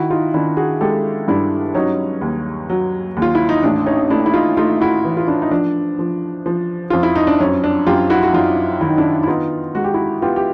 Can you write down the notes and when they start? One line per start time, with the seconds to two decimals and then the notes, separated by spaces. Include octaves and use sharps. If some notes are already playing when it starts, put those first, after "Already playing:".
Already playing: D#3 E4 F#4
0.10 D#4 F4
0.34 D#3 D4 E4
0.57 F#4 G#4
0.81 G#3 G4 A4
1.28 G2 D4 E4
1.74 F#3 C#4 D#4
2.21 D#2
2.70 F#3
3.17 D#2
3.22 F4
3.35 E4
3.49 D#4
3.63 A1 D4
3.86 C#4 D#4
4.10 A3 D4 E4
4.26 E4
4.34 D#4 F4
4.57 A3 D#4 F4
4.80 E4 F#4
5.05 E3
5.17 F4
5.28 D4 E4
5.42 D#4
5.51 F3 D4
5.99 F3
6.46 F3
6.90 F2 F4
7.03 E4
7.16 D#4
7.27 D4
7.40 F#2 C#4
7.64 D4
7.87 F#2 F4 G4
8.10 E4 F#4
8.23 F#4
8.34 F#2 D#4 F4
8.81 D#3 E4
8.89 D#4
8.98 D4 E4
9.23 E4
9.27 B3 D#4 F4
9.75 G#3 F#4
9.84 G4
9.94 E4 F#4
10.22 B3 F4 G4
10.36 G4